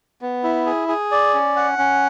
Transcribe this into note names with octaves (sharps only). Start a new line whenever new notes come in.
B3
E4
G#4
G#4
D5
C#4
F#5
C#4